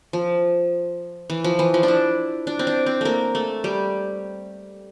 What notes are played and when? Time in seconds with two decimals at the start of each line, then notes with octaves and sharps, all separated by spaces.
0.13 F3
1.30 E3
1.44 F3
1.59 E3
1.74 F3
1.83 D4
1.88 E4
2.47 D4
2.59 C4
2.67 D4
2.86 C4
3.01 A3 A#3
3.35 A3
3.64 G3